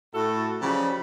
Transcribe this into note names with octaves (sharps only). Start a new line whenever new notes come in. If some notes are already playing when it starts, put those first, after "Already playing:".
A2 E4 F#4 A4
C#3 F3 F#3 G4 D5 B5